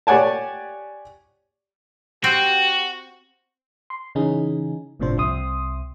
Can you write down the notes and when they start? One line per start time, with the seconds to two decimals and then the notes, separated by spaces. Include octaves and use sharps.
0.07 G4 C#5 D5 F#5 G#5 A5
2.24 C4 F#4 G4
3.90 C6
4.15 C#3 E3 C#4 D#4 G#4
5.00 G1 A2 C3 F3 D4 C5
5.17 C2 C3 C4 E5 C6 D#6